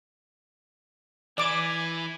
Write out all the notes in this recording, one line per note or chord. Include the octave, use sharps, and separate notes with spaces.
E3 E4 D5 G#5 D6